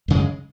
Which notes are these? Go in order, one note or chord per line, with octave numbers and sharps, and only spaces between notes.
F#2 C#3 G#3